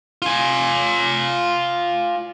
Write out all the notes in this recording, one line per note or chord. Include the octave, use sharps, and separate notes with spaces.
F4 G#5